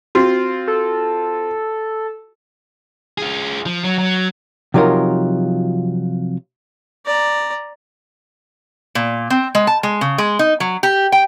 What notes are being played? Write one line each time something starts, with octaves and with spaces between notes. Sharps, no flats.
C4 F4 F#4
A4
F4 G#4
F3
F#3
F#3
C3 F3 F#3 D#4 F4 A#4
D5 A#5
A#2
C4
G#3
A5
G#3
C#3
G#3
D#4
F#3
G4
G5